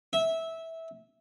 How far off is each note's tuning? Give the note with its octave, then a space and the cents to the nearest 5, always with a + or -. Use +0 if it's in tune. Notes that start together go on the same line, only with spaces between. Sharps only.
E5 -15